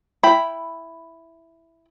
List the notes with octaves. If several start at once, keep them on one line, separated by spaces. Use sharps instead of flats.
E4 G5 B5